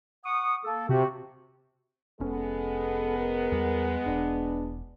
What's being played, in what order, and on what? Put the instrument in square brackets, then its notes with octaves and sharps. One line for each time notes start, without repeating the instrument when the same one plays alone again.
[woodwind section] F#5 C#6 D#6
A#3 A4
[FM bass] C3 [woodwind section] F#4 G4
[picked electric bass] F1 C#4 [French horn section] G#3 B3 [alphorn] A4
[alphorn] A#4
[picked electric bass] E2 G3
[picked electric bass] E1 [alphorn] D4